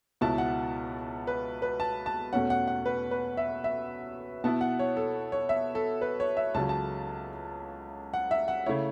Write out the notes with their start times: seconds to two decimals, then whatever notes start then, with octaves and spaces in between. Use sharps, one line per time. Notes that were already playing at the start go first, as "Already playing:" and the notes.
0.21 C#2 B2 B3 E4 A5
0.38 F#5
1.27 B4
1.62 B4
1.80 A5
2.06 A5
2.33 E2 B2 A3 C#4 F#5
2.50 F#5
2.68 F#5
2.86 B4
3.11 B4
3.37 E5
3.64 E5
4.44 B2 B3 E4 A5
4.61 F#5
4.79 C#5
4.97 A4
5.32 C#5
5.49 E5
5.75 A4
6.01 B4
6.20 C#5
6.37 E5
6.54 C#2 C#3 F#3 A5
6.69 A5
8.14 F#5
8.31 E5
8.48 F#5
8.66 C#3 A3 E4 C#5